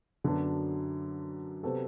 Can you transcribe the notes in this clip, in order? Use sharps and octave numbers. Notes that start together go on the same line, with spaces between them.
F#2 D3 F#3 B3 D4
C3 F#3 B3 F#4 A4